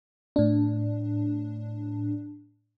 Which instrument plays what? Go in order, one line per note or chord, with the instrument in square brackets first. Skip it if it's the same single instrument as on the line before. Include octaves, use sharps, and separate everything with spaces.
[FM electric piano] A2 D4